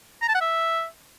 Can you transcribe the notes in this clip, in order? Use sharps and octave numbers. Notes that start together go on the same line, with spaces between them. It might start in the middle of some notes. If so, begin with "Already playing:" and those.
A#5
A5
F#5
E5